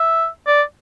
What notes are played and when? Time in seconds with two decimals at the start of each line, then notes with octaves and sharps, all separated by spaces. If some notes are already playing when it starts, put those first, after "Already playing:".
Already playing: E5
0.47 D5